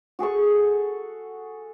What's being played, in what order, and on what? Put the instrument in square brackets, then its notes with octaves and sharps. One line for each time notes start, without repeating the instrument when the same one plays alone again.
[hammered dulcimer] F#4 G#4 A4 C#6